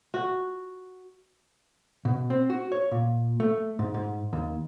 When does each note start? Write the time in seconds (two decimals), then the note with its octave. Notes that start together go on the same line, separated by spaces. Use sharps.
0.14 F#4
2.05 B2
2.30 C4
2.50 F#4
2.72 C#5
2.91 A#2
3.40 A3
3.79 G#2
3.94 G#2
4.33 D#2